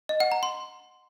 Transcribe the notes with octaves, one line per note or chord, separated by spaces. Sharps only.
D#5
F#5
A#5
C6